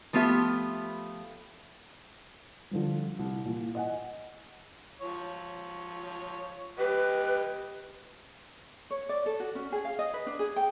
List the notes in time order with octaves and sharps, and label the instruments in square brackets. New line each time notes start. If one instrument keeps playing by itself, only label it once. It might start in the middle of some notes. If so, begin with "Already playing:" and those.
[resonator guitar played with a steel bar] F3 A3 B3 F4 G4 E5
[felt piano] D3 F3 G3
C2
A#2 E3
D#5 F#5 G#5
[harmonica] F3 C#5
[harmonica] G3 G4 D#5 [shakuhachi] B4
[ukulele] C#5
D5
A4
F#4
C#4
G#4
F5
D#5
B4
D4
G#4
G5